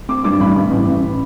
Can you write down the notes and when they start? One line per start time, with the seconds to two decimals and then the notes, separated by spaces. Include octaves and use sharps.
0.09 C4 D6
0.24 G2 D6
0.40 A1 B5
0.56 A1
0.71 A1
0.87 A1